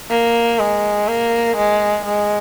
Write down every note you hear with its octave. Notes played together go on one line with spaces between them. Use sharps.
A#3
G#3
A#3
G#3
G#3